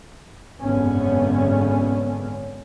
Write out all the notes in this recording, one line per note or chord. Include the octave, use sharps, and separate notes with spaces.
G#1 F#2 B2 D3 B3 C#4